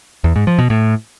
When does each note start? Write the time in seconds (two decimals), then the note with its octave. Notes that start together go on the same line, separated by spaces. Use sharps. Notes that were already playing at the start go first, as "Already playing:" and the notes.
0.24 E2
0.36 G#2
0.47 F3
0.59 B2
0.70 A2